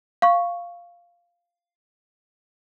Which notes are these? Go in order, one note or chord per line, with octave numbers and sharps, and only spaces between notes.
F5 C#6